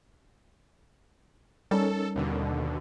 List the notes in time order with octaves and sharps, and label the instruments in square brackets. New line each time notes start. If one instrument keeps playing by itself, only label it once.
[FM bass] G3 [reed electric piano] C#4 D#4 A#4 [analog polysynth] A4
[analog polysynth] D#2 B2 D3